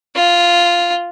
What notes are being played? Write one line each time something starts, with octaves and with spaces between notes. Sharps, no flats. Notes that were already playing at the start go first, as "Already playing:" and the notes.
F4